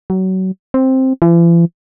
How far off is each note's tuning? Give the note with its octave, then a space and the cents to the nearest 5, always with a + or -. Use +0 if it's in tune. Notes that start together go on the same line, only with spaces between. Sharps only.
F#3 +25
C4 +5
E3 +45